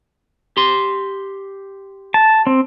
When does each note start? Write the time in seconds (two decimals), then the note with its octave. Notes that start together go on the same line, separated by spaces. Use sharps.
0.57 G4 C6
2.14 A5
2.47 C4